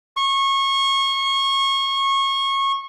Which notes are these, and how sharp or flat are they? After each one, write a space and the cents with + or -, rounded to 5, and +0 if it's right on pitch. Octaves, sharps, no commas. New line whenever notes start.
C#6 -25